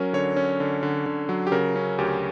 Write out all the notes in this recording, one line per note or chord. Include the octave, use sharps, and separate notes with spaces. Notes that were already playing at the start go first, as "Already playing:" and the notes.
Already playing: F#3 C#4 A#4
D3 C#5
C#4
D3
D3
D3
F#3
G4
C#3 A#4
C#4
D2 G4